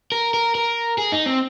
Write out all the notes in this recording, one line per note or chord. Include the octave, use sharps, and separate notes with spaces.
A#4
A#4
A#4
G#4
D#4
C4